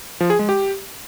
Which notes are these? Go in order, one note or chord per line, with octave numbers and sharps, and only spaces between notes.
F3
G#4
G#3
G4